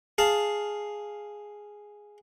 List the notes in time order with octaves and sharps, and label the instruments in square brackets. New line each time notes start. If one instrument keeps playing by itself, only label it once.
[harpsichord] G#4 F5 A5